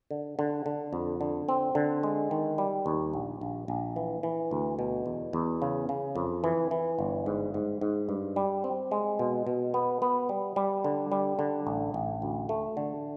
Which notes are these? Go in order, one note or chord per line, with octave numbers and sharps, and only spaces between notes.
D3
D3
D3
F2
D3
C4
D3
G#3
D#3
G3
D#2
A#1
A#1
A#1
E3
E3
D2
B2
E2
E2
C#3
C#3
F2
E3
E3
G1
G#2
G#2
G#2
G2
G3
C4
G#3
B2
B2
B3
B3
G3
G3
D3
G3
D3
A1
A1
D2
A3
D3